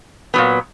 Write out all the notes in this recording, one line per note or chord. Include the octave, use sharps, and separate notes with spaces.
A#2 F#3 B3